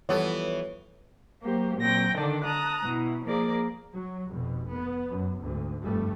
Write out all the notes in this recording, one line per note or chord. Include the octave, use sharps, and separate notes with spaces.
E3 F3 G3 B3 A4 C#5
F#3 A#3 G4 C5
A#2 F#3 C4 G5 A#6
D3 D#3 D4 A4 D5
A5 A#5 D#6 F#6
B2 E4
F3 A#3 G#4 A#4 D5
F#3
F1 B2
B3
F#2
D2 G#2
F1 G2 G3 A3